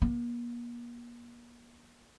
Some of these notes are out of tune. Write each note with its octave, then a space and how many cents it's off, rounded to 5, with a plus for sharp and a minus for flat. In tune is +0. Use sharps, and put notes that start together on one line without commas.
A#3 +40